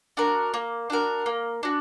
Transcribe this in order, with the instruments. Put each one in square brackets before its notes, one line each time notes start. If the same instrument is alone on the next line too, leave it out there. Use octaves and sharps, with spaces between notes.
[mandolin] D4 F#4 A#4
A#3
D4 F#4 A#4
A#3
D4 F#4